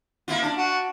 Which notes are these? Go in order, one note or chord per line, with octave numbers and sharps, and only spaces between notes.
A#3 E4 F4
D4
F#4